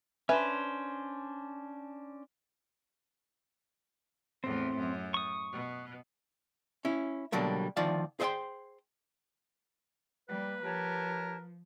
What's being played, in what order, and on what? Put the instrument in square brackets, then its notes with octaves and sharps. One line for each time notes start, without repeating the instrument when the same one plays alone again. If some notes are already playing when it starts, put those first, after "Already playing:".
[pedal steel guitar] C#4 D4 C5 [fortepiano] B4 G#5 [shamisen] E5
[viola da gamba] E2 A2 [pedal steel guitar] C4
[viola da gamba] F#2
[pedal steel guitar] C#6 D#6
[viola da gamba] B2
[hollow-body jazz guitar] C#4 E4
B2 D3 F#3 G3 A#3
D2 D#3 F3 F4 D5 F5
G#4 C5 D#5 E5 G5 C6
[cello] G3 A#3 [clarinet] B4
[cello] F3 [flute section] G4 C#5 A5 [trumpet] A#4